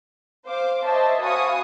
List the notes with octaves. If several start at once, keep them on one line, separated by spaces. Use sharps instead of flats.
C5 F5 D6
C5 C#5 D#5 E5 A5
F#4 F5 G#5 B5 C#6 D#6